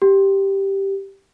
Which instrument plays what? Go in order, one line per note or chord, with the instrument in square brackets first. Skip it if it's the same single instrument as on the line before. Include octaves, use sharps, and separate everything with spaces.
[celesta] G4